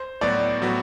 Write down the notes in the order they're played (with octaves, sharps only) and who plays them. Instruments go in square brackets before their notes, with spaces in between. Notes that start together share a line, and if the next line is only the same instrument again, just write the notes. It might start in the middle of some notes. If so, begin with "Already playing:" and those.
Already playing: [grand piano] C5
[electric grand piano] A2 F#3 B3 F#4 [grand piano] D5
[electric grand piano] A2 F#3 B3 F#4